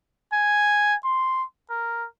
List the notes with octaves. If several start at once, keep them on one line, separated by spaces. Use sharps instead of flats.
G#5
C6
A#4